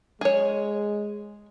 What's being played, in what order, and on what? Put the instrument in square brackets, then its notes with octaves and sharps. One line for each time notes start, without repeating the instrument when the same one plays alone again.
[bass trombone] G#3 [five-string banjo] G#4 C#5